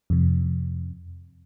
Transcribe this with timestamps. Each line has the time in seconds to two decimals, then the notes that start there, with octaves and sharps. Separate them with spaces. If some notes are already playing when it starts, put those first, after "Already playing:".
0.10 F2 C3